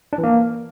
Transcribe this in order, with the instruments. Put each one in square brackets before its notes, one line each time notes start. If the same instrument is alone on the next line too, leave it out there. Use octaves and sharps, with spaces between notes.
[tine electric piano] D4
E3
A#3